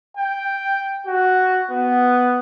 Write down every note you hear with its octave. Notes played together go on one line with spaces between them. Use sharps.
G5
F#4
B3